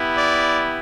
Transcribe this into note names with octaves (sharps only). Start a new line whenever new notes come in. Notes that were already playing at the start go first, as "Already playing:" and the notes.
Already playing: B3 E4 G4
D5